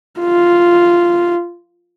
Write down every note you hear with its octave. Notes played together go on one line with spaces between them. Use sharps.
F4